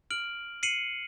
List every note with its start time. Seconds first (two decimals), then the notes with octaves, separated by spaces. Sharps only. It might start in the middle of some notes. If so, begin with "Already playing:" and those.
0.10 F6 D7 F#7
0.63 C7 C#7 D#7 F#7